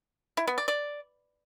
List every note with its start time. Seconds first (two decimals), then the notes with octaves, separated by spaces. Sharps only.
0.37 E4
0.47 B3
0.58 D5
0.68 D5